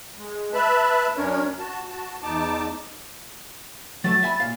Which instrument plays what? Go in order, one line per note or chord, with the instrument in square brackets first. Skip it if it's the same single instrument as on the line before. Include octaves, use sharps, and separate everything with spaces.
[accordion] G#3
B4 E5 A5 B5
F#2 C#4 D4 A#4 C#5
F#4 A5
F#4 A5
E2 D#4 A5 D6
[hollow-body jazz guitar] F#3 A3 [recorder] A6
[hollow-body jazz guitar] E5 G#5 B5
A#2 F5